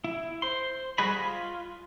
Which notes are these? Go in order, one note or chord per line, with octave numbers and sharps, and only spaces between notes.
E4
C5 C6
G3 F#4 G#4 D#5 B5
F4